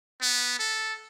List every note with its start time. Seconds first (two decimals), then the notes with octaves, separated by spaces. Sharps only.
0.21 B3
0.59 A4